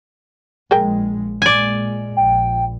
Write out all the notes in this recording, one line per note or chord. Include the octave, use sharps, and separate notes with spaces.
A#1 A#2 G#3 G#4 A#4 G5
A#2 G#3 D5 G#5
A#1 G5